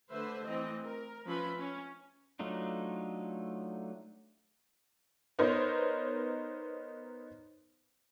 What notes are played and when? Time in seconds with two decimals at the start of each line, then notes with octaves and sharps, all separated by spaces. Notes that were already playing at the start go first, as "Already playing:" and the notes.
0.11 D3 A3 B4 C5 E5
0.45 E3 A3 C4 D#5
0.82 A#4
1.27 F3 C#4 B4 E5 B5 C6
1.57 C#4
2.39 F#3 A3 D4 D#4 F4
5.39 B3 D#4 A#4 C5 C#5